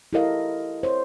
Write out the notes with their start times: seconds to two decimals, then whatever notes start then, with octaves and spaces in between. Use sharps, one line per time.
0.13 E4 G4 A4 A#4 D#5 F5
0.83 C5 C#5